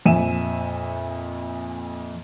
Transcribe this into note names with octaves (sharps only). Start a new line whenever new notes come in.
F2 A#2 E5 G#5 D#7 E7